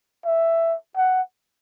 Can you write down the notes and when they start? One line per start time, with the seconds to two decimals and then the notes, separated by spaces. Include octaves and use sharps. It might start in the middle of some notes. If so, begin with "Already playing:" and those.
0.26 E5
0.97 F#5